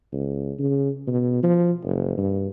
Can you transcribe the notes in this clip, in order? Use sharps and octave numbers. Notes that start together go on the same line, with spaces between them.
C#2
C#3
B2
F3
F#1
G2